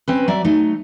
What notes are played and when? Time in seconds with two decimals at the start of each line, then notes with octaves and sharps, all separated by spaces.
0.08 C4 C#4 B4
0.28 F#3 D5 E5
0.45 F#3 A3 D#4